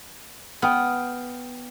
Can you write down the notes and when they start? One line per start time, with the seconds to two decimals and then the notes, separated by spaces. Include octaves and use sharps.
0.62 B3 G5 D#6 F6